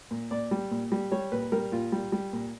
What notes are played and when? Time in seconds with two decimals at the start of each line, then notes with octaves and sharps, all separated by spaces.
0.11 A#2
0.31 A#2 D5
0.51 G3
0.71 A#2
0.92 G3
1.12 G3 C#5
1.32 A#2 B4
1.52 G3 A#4
1.72 A#2 F4
1.92 G3
2.12 G3
2.33 A#2